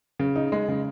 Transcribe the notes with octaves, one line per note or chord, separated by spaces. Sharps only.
C#3
D#4
G#3
C#3